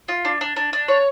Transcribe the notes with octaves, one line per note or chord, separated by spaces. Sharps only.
F4
D4
D4
D4
D4
C#5